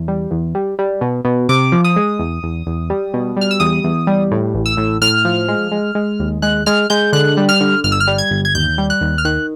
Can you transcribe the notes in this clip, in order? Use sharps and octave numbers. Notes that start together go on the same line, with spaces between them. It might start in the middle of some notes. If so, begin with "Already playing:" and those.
Already playing: E2
G3
E2
G3
G3
B2
B2
C3 D6
F3
D#6
G#3
E2
E2
E2
G3
B2
G3 F6
E6
E2 D#6
E2
G3
A2
A1
E6
A2
A2 F6
F3
G#3
G#3
G#3
D#2
G#3 F#6
G#3 F6
G#3 G6
D3 F#6
G3
F6
D3
G1 F6
E6
F6
G3
G#6
G1
G#6
D#2 G6
G3
F#6
D#2
F6
D#3 F#6